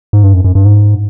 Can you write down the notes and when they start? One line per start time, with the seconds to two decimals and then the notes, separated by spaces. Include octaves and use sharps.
0.13 G#2
0.23 G2
0.33 F#2
0.45 F#2
0.55 G2
0.65 G#2